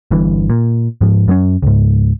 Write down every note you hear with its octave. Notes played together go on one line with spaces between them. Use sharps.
G1 G2 E3
A#2
G#2 F3
F#2 F#3 B3 C#4
C#2 G#2